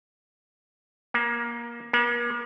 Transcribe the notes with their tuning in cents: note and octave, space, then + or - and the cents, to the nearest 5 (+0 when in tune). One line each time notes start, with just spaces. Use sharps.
A#3 +20
A#3 +40